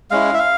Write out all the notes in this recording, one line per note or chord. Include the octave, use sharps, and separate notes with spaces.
G#3 C#4 E4 F5
E5
F5